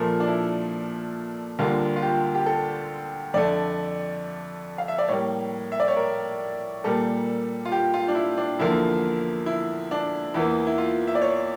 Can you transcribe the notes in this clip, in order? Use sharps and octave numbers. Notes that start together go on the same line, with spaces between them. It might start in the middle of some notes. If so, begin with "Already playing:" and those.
Already playing: A#2 F3 A3 A#4
D4
E4
D2 D3 G3 A#3 F4
F4
G4
G4
A4
F2 D3 A3 D5
F5
E5
D5
A2 G3 A#3 C#5
E5
D5
C#5
A#4
A#2 G3 A#3 A4
F4
G4
F4
D4
E4
D4
E2 D3 F3 A#3 E4
E4
D4
E2 E3 A#3 E4
E4
F4
E5
D5
C#5